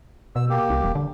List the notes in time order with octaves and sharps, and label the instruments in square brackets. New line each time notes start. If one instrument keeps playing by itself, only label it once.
[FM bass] B2 [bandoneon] E6
[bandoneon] A#3 G4
[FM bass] C2
E1
D3